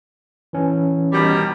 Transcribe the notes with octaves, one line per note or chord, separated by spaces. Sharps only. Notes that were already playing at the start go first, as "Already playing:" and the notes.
E3 C#4
B2 D#3 G3